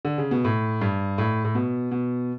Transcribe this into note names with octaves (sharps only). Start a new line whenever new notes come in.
D3
C#3
B2
A2
G2
A2
A2
B2
B2